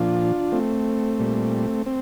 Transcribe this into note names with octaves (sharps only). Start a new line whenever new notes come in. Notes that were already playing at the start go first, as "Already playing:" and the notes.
Already playing: A#2 F3 D4 F4
A3 C4
A#2 G3
C4